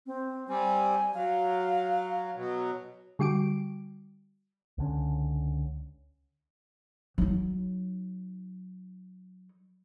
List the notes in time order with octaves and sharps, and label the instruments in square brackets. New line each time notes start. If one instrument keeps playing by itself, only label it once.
[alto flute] C4
[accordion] G3 C4 [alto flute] G#5
[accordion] F#3 [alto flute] F5
[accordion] B2 F#3
[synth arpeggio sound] D3 G3 F#4 G5 D6 D7
[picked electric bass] C#2 D3 C#4
[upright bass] F#3 D#4